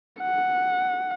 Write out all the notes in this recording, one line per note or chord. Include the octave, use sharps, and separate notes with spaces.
F#5